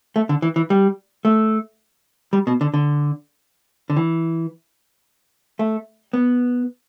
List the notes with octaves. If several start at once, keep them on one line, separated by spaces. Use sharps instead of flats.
A3
D3
E3
E3
G3
A3
G3
B2
D3
D3
D3
E3
A3
B3